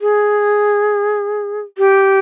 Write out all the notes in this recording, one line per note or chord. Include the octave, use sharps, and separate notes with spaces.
G#4
G4